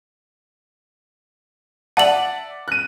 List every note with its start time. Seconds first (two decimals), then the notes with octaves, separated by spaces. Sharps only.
1.97 D5 E5 F#5 A5 F#7
2.68 F#6 D#7